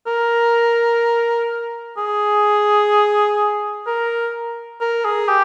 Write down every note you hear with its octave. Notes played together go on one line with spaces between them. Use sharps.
A#4
G#4
A#4
A#4
G#4
G4